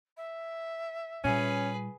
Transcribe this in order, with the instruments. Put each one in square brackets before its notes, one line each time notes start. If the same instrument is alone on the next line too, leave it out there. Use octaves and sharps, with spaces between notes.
[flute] E5
[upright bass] A#2 G3 [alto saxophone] C#4 [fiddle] G#4 B4